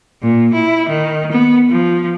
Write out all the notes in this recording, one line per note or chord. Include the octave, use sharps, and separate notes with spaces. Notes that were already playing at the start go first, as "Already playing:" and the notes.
A#2
E4
D#3
B3
F3